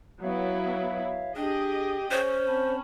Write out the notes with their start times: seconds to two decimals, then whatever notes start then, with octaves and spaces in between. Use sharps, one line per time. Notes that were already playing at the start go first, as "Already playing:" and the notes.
0.23 F#3 B3 E4 C#5 E5 F5
1.36 D4 G4 G#4 D#5 G5
2.11 C#4 C5
2.47 C4 A5 B5